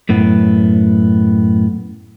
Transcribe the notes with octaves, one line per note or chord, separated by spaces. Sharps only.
F#2 A2 B3